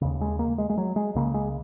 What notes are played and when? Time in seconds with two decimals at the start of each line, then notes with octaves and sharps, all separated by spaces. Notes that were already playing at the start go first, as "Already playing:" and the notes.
0.01 D#2 C#3
0.21 G#3
0.39 A#3
0.58 G#3
0.70 G#3
0.78 F#3
0.96 G#3
1.15 C#2 C#3 A#3
1.34 G#3